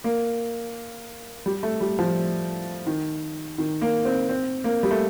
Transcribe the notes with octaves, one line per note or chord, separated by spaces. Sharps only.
A#3
G3
A3
G3
F3
D#3
D#3
A#3
C4
C4
A#3
G3
A3